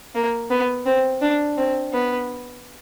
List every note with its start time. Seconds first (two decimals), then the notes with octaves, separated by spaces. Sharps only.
0.15 A#3
0.51 B3
0.86 C4
1.21 D4
1.57 C4
1.93 B3